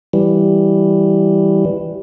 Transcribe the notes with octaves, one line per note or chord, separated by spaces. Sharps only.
E3 G3